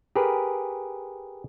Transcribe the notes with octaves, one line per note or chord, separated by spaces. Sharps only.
G4 G#4 A#4 B4